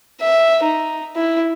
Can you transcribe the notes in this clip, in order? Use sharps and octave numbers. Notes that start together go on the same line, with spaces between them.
E5
D#4
E4